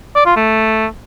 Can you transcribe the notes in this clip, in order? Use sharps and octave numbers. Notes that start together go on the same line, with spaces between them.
D5
F4
A3